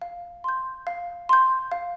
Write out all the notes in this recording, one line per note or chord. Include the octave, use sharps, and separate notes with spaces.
F5
C6 G6
F5
C6 G6
F5